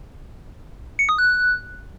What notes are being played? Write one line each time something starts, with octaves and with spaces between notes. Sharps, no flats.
C#7
D#6
F#6